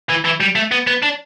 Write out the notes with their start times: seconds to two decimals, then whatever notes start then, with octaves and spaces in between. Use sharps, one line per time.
0.09 E3
0.24 E3
0.40 G3
0.55 A3
0.72 B3
0.87 B3
1.03 D4